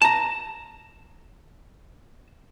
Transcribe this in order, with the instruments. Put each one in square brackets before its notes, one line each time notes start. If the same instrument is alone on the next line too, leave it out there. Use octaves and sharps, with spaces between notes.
[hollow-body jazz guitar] A5 A#5